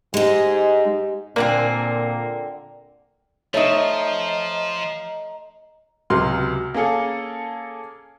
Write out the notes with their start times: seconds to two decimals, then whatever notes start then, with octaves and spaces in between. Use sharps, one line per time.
0.14 G#2 G#3 D#4 G4 D#5
1.36 A#2 D3 A#3 C4 G#5
3.54 F3 A3 D#4 C#5 D#5 A#5
6.10 C#2 C3 F#3 C6 F6
6.74 A#3 C#4 G#4 A4